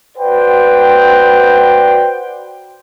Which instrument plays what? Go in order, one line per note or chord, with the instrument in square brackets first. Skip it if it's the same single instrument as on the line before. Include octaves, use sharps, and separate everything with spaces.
[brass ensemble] F#4 B4 C5 D5 F#5 G5